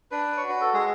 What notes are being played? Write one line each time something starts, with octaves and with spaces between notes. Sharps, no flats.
D4 B4
C#5
F#4
B4
A4
G#3 G#4